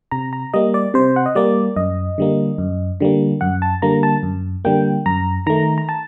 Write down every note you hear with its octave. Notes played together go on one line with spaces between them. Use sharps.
C3 A#5
A#5
G3 A#3 D#5
D5
C3 C5
F#5
D#5
G3 A#3 D5
F#2 D#5
D3 G3 A#3
F#2
D3 G3 A#3
F#2 F#5
A5
D3 G3 A#3 A#5
A5
F#2
D3 G3 A#3 G5
F#2 A#5
D#3 A3 A#5
A#5
A5